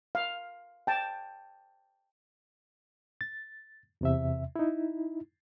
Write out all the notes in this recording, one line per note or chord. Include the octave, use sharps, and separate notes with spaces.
F5
G5 A5
A6
E2 C3 E5
D#4 E4